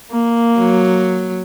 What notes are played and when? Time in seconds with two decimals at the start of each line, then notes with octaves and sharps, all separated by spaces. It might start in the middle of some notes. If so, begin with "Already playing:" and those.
0.11 A#3
0.58 F#3